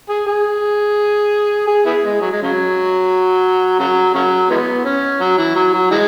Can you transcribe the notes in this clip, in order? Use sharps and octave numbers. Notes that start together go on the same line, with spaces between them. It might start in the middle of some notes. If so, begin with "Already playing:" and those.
G#4
G#4
G#4
B3 E4 G#4
G#3
F#3
G#3
C#3 F#3
C#3 F#3
C#3 F#3
E3 G#3 B3
C#4
F#3
E3
F#3
F#3
E3 G#3